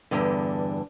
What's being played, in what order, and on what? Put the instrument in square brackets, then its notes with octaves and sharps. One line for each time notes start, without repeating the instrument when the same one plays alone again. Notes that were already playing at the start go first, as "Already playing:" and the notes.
[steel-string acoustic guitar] E2 G2 D3